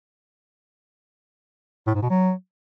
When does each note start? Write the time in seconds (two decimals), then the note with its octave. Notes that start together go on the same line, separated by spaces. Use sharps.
1.87 A2
1.95 G#2
2.02 B2
2.10 F#3